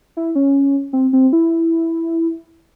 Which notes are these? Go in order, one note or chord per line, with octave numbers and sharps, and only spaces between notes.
E4
C#4
C4
C4
E4